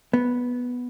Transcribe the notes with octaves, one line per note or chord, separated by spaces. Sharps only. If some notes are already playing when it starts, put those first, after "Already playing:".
B3